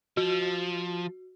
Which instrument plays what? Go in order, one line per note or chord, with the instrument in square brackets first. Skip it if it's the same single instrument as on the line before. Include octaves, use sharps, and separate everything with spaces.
[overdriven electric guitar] F3 [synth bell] F#4